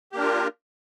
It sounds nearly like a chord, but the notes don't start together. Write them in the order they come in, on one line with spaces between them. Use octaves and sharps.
G4 A#3 D4 A#4 F4